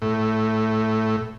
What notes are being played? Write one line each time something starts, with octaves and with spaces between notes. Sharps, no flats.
A2